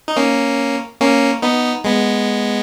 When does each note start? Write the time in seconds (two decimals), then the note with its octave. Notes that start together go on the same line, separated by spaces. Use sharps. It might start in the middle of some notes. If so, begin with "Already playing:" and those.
0.08 D#4
0.16 A#3 C#4
1.01 A#3 C#4
1.42 B3 D#4
1.84 G#3 B3